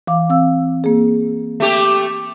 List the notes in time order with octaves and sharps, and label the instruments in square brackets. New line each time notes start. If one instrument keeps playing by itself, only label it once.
[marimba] E3 F5 D6
C4 F5 E6
A#3 G#4
[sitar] A3 G4